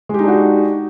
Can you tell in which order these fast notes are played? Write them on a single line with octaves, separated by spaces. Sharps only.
G#3 G4 D#4 D4 F#4